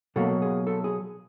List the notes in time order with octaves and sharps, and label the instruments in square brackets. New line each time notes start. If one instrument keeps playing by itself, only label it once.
[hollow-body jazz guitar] B2 F#3 A#3 A4
G#4
A4
G#4